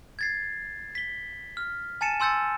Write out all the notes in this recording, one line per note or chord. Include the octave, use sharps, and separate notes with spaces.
G#6 A6 C7
B6 G7
F6
G#5 A5 A6 C#7 D#7 E7
G#5 C6 E6 G6 A6 C#7